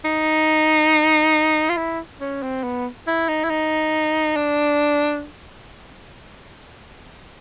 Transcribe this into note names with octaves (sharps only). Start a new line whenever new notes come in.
D#4
F4
E4
C#4
C4
B3
E4
D#4
E4
D#4
D4